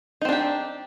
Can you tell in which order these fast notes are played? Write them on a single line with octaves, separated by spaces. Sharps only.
D#4 C4 D4 G4